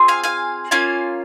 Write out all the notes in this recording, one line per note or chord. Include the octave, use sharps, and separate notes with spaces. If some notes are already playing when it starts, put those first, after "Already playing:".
Already playing: C4 F4 G#4
F5 G#5
F5 G#5
A#3 C#4 F4 F5 G#5